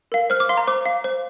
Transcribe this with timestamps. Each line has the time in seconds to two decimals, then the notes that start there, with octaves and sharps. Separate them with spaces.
0.12 A#4 F5
0.30 C5 F6
0.40 D6
0.49 F5 C6
0.57 A#5
0.67 C5 D6
0.86 F5
1.04 C5